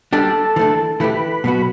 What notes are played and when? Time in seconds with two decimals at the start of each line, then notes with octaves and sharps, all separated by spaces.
0.13 G3 D4 G4 A4
0.56 E3 A3 D4
1.00 E3 A3 E4 G4 B4
1.44 B2 F#3 B3 F#4